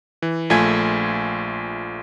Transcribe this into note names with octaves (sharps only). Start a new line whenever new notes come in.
E3
A#1 A3 F4 G#5 G#6